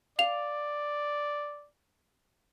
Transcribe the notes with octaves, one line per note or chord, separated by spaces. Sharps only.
D5 F5 F7